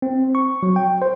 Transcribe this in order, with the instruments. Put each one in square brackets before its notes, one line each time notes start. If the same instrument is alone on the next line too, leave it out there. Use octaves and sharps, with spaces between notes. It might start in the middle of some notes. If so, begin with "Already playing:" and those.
[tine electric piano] C4
C#6
F#3
G5
C5